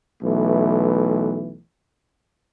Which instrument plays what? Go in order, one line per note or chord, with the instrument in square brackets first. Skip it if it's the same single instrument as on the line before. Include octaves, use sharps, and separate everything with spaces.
[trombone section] B1 E3 A3